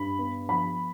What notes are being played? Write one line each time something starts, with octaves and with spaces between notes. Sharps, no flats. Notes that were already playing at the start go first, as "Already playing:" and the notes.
Already playing: G2 B5
B3
F3 B5